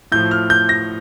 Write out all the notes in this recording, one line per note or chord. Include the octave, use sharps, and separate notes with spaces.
A2 F3 G6
F6
G6
A#6